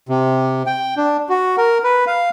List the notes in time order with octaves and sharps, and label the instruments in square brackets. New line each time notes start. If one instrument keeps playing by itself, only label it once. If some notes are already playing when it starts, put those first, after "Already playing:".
[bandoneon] C3
G5
D4
F#4
A#4
B4
F5